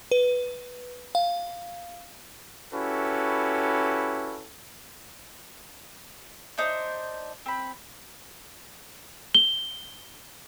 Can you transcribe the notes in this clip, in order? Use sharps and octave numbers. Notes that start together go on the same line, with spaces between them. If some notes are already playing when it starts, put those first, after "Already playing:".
B4
F5
C#4 E4 F#4 G4 A4 B4
D4 D#4 C5
C4 B5
G7